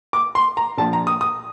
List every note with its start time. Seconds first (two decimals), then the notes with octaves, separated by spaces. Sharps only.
0.13 D6
0.35 C6
0.57 A#5
0.78 A#1 A#2 F3 A5
0.93 A#5
1.07 D#6
1.21 D#6